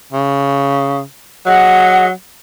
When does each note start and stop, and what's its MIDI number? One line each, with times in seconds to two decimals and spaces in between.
0.12 1.02 49
1.46 2.11 54
1.46 2.07 68
1.46 2.07 75
1.46 2.07 78